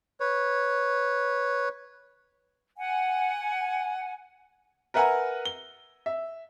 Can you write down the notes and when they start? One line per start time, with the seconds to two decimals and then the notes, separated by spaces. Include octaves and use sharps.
0.20 B4 C#5
2.77 F#5 G#5
4.94 A#4 B4 E5 F#5 G#5 A#5
5.46 G7
6.06 E5